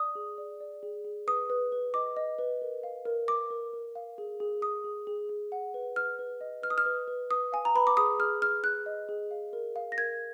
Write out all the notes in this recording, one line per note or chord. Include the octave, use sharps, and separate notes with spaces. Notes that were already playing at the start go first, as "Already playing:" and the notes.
Already playing: D5 D#6
G#4
D5
D5
G#4
G#4
B4 D#6
B4
B4
D#5 D6
D#5
B4
A#4
F5
A#4
A#4 D6
A#4
A#4
F5
G#4
G#4
G#4 D#6
G#4
G#4
G#4
F#5
B4
B4 F6
B4
D#5
B4 F6
D#6
F6
B4
B4
B4 D#6
F5 G#5
A#5
B4 B5
D6
G#4 D#6
G#4 F6
G#4 F6
G#4 F#6
D#5
G#4
F5
A#4
F5
A#6
A#4 G#6